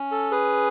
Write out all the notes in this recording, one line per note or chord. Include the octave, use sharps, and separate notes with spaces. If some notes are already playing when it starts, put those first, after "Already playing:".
Already playing: C#4
A4
G#4 B4